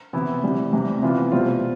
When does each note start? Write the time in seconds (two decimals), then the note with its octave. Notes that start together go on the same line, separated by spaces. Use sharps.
0.13 C3 E3 B3 E4
0.43 C3 E3 G3 B3
0.73 C3 E3 G3
1.02 C3 E3 B3 F4
1.32 B2 G3 C4 F4